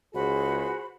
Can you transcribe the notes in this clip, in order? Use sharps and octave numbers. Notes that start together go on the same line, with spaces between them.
C#2 F#4 G#4 C5 B5